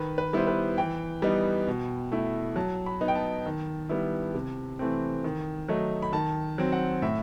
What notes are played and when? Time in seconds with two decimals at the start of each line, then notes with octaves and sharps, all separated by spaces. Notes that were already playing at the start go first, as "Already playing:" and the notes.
Already playing: D#3 B4
0.18 B4
0.33 G3 B3 E4 C5
0.47 B4
0.78 E3 G5
1.22 G3 B3 D#4
1.68 B2
2.12 A3 E4
2.56 F#3 A5
2.86 B5
3.01 B3 D#4
3.08 G5
3.15 A5
3.46 D#3
3.89 G3 B3 E4
4.35 C3
4.79 E3 A3 C4
5.24 D#3
5.68 F#3 A3 D#4
6.02 B5
6.13 D#3 A5
6.58 F#3 C4
6.72 F#5
7.02 A2 E5